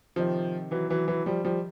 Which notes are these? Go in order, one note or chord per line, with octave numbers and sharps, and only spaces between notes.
C3 D#3 F3
E3 F#3
E3 F#3
E3 F#3
F3 G3
F3 G3